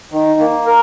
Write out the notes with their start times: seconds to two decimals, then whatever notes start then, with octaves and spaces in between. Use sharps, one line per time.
0.12 D#3
0.40 A#3
0.67 A#4